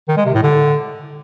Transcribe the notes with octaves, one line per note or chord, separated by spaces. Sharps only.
D#3
G#3
C3
A2
D3